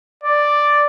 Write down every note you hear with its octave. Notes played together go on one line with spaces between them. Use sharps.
D5